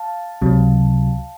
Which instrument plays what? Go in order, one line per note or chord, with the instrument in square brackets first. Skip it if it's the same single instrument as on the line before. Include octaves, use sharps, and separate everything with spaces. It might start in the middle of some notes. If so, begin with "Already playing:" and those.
Already playing: [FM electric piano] F5 A5
C#2 C3 F#3